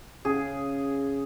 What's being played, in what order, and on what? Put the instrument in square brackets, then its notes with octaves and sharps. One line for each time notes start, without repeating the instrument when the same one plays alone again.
[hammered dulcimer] C#3 [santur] G#4